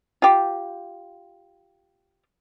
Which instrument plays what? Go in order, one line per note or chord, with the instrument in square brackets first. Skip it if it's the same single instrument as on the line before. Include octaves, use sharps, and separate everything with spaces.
[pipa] F4 G4